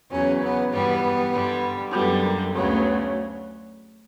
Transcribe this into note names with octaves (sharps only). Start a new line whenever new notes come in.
E2 C#3 F#3 C#4
B3
G2 E3 G3 B3
G2 D3 G3
F#2 D3 G3 B3
A#3
D2 C#3 F#3 B3